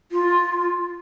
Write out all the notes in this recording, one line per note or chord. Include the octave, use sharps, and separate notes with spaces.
F4